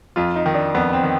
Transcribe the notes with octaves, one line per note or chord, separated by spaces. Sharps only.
F2 F4
D#4
D#3
D4
F2 B3
C4
D#3